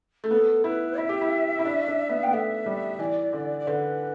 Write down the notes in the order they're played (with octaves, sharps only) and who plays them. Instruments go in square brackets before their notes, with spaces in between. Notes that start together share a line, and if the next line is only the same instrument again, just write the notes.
[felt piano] A3
[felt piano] B3 [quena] A4
[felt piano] E4 [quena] B4
[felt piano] E4 [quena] E5
[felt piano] G4
E4
E4
D4
D4
B3
[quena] G5
[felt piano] B3
[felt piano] A3 [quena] E5
[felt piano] G3
[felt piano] E3 [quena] D5
[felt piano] D3
[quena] D5
[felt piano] D3 [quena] B4